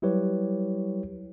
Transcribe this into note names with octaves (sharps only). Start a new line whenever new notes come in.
F#3 G3 E4 G4 B4 C#5